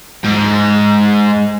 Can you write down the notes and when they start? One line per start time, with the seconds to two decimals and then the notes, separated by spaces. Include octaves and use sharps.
0.25 G#2